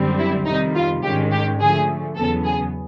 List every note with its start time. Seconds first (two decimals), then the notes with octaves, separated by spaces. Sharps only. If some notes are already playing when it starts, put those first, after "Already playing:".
Already playing: F#2 D3 G3 C4
0.18 E4
0.46 F2 C3 D#3 G3 D#4
0.75 F4
1.03 G#2 D#3 G#3 C#4 G4
1.32 G4
1.60 D3 F3 A3 G#4
2.16 E2 C#3 F#3 B3 A4
2.45 G#4